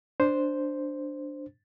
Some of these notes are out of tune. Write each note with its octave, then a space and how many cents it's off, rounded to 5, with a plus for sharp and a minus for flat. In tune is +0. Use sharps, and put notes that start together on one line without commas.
D4 +0 C5 +0